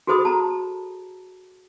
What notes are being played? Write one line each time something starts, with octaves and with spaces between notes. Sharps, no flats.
F#4 G#4 A4 C5 B5 D#6
A5 A#5